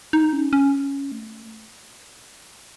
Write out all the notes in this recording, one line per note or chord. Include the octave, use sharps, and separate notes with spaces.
D#4
C#4
C#4
A3